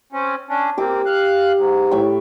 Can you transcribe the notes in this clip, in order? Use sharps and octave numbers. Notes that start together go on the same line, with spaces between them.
C4 C#4
C#4 D4
A#3 C4 G4 D6
F5 F#6
G#2
A2 G5 C#6